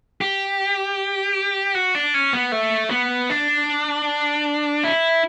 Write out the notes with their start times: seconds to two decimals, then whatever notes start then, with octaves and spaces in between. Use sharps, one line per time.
0.21 G4
1.75 F#4
1.95 D4
2.14 C#4
2.33 B3
2.52 A3
2.90 B3
3.30 D4
4.84 E4